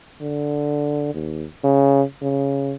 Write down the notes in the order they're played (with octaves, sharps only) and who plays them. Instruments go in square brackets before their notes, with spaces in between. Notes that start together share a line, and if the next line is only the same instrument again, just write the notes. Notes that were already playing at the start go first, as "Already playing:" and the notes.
[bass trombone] D3
D#2
C#3
C#3